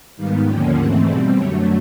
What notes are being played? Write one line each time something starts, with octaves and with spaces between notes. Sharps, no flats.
G#2 D#3 G3 B3 F5
D#2 D3 F3 A#3 C#4 G5
G#2 E3 A3 C4 F#5
B2 G3 C4 D5
F#2 D3 F#3 A3 C#5